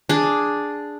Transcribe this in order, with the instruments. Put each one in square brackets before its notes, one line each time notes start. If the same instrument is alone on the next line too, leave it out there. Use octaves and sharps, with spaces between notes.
[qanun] D4 G#4